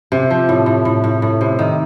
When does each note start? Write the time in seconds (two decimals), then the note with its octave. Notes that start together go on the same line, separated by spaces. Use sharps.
0.12 C3
0.30 F3
0.49 A2
0.66 A2
0.85 A2
1.04 A2
1.22 A2
1.41 C3
1.59 D#3